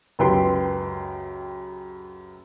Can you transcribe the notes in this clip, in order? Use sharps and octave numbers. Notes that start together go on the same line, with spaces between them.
C#2 F#2 G4 B4 G5 C6